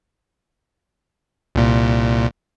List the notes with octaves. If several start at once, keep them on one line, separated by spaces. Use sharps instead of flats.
C2 A#2